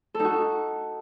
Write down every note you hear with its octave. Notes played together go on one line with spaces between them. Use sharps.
A4
D#4
F#4